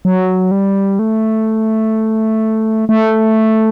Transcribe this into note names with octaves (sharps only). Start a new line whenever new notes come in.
F#3
G3
A3
A3